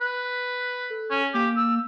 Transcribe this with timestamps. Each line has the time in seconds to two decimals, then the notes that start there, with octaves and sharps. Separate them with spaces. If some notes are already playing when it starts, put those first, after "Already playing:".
0.01 B4
0.90 A4
1.11 C#4
1.34 A#3 G4
1.56 E6